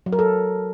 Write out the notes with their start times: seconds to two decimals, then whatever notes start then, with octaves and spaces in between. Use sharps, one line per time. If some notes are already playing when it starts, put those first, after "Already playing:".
0.06 F#3
0.12 A#4
0.19 A4